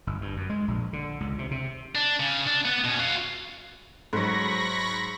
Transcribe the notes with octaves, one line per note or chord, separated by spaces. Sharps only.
G1
G2
F#2
G#3
A#1
D3
C#2
C3
C3
D4
C#3
D4
B3
B2 C#4
F#4 F5
G#2 F#3 B5 C#6 A#6